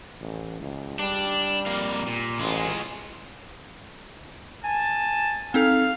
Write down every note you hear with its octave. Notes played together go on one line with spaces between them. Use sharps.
A1
C#2
G3 D4
F2 A#3 F5
A#2
A1 G#3 F4
G#5 A5
C4 D#4 A4 F5